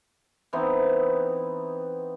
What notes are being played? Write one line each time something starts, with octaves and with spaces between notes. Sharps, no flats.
E3 B3 C4 D#4